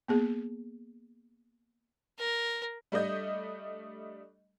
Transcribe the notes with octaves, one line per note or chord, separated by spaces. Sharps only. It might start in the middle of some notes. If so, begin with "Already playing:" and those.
A#3 B3 G#4
A#4
G3 A3 D4 D#5 G6